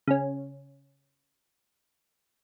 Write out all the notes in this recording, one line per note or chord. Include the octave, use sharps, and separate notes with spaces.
C#3 C#4